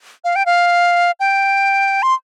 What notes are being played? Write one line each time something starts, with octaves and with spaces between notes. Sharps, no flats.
F5
G5
F5
G5
C6